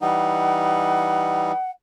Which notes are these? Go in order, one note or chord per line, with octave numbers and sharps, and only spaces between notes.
E3 G3 D#4 F#5